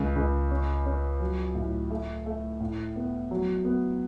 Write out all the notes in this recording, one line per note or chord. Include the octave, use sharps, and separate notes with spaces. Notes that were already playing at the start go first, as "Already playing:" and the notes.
Already playing: C#2
C#2
C#4
C#4
F#3
A2
A3
A3
A2
B3
F#3
B3